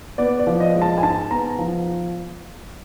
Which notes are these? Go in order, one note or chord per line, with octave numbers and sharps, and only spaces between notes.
B3 D5
D5
F3
D#5
G#3
A5
G#5
G#2 A5
B3 A#5
F3